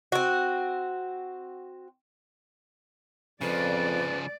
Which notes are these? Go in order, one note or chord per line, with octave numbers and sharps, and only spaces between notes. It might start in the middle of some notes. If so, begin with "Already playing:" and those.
C4 F#4
F2 C#3 F3 B4 D5